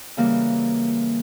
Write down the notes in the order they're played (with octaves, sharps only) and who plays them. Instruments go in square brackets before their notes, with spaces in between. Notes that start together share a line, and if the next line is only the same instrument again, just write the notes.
[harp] C#3 E3 G3 A#3